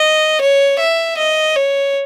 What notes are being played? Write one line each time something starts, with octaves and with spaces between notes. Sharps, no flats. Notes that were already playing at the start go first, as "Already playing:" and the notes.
Already playing: D#5
C#5
E5
D#5
C#5